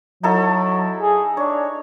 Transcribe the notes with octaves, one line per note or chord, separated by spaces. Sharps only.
F#3 D#4 E4 A4
G#4
D4 C#5